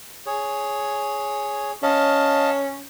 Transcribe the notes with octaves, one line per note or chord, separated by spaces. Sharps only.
G#4 C#5
C#4 D#5 F5 A5